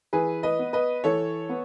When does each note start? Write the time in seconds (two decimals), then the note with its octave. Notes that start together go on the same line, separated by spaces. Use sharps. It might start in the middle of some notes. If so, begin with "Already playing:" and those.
0.13 E3 G#4 B4
0.43 B4 D#5
0.59 B3
0.73 B4 D#5
1.04 E3 A4 C#5
1.49 B3